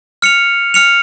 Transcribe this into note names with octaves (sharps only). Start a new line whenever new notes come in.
F6 C#7 F7
F6 C#7 F7